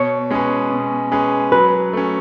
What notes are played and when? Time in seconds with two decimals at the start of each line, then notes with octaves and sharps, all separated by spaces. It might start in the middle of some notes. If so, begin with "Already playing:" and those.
Already playing: B2 C#5
0.30 G#3 C#4 G#4 B4
0.71 B2
1.12 G#3 C#4 G#4 B4
1.52 F#3 B4
1.93 A3 C#4